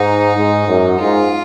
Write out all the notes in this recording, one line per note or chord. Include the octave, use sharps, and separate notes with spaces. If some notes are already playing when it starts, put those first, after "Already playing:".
Already playing: G#2 D#4
G#2
F#2
G#2 F4